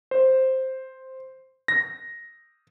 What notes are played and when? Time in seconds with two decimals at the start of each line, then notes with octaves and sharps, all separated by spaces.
0.11 C5
1.68 A#6